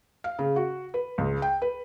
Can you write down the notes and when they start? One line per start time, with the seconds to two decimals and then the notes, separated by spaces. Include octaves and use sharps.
0.24 F5
0.39 C#3
0.56 F#4
0.94 B4
1.18 C#2
1.42 G5
1.62 B4